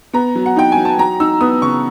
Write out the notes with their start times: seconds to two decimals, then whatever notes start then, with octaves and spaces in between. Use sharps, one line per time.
0.13 B3 A#5
0.35 F#3
0.46 F#5
0.56 D#4 G5
0.72 G#5
0.77 F#3
0.85 A5
0.98 F#3 A#5
1.20 D#4 E6
1.41 B3 D#6
1.62 C#3 C#6